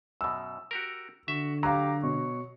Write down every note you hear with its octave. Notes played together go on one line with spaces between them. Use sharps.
F#2 B2 E6
F#4 G4 A#4
D3 F#4 E5
F#3 G4 F5 A#5
B2 C#5